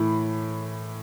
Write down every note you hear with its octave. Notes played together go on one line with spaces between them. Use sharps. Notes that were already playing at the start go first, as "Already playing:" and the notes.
Already playing: A2 E3 B5